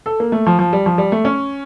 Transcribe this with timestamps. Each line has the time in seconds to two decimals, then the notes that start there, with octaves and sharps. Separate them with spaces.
0.06 A4
0.20 A#3
0.32 A3
0.47 F3
0.59 F3
0.73 G3
0.86 F3
0.98 G3
1.12 A3
1.25 C#4